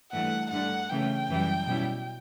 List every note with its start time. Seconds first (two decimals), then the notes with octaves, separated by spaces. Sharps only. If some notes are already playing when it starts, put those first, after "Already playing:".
0.12 G2 E3 A3 F#5
0.51 G2 D3 A3 F#5
0.90 C#3 E3 A3 C#4 G5
1.29 F#2 E3 G3
1.67 B2 G3 C#4 E4